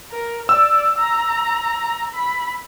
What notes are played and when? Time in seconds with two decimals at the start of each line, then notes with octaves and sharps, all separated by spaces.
0.11 A#4
0.49 D5 E6
0.97 A#5
2.14 B5